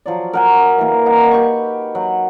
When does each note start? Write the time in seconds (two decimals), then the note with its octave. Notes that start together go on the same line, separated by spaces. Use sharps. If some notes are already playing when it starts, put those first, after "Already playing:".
0.06 F3 F#3 D5
0.33 A#4 F#5 G#5
0.78 E3 A#3
1.06 D#4 F#5 A#5
1.31 G4 B4 C#6
1.95 F#3 F#5